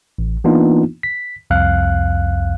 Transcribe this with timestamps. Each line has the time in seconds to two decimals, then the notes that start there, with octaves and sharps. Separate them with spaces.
0.19 A1
0.44 E3 A#3 B3 D4 D#4 F4
1.03 B6
1.50 C2 F2 F5 F#6